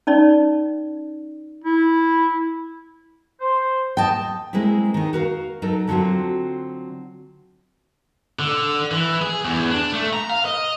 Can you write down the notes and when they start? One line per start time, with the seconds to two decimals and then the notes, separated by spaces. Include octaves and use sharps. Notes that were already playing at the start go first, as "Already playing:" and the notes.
0.07 C#4 D#4 D5
1.65 E4
3.40 C5
3.97 D#5 G5 A5
4.53 G#3 A#3 C4 E4
4.94 D#3 D#4
5.13 F#4 A#4 F5
5.62 F#3 D#4 A4 A#4
5.87 D3 F#3 C4 F4 F#4
8.39 D3
8.91 E3
9.22 G#4
9.45 E2
9.71 D4
9.92 A3
10.13 A#5
10.29 F5
10.45 D#5